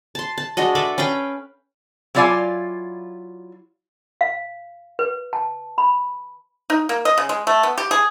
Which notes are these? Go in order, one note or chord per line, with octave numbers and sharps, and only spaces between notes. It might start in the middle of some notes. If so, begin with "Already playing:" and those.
A5 C6
A5
G#3 D4 F#4 D#5
A4 B4 E5 D6
C#4 B4 F5 G5
F#3 E4 F4 D5 F5 G#5
F5
B4
A5
B5
D#4
A#3
D#5
C#3
G#3
A3
B3
G4
G#4